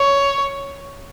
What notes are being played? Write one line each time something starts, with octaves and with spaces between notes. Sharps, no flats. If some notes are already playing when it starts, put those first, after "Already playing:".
Already playing: C#5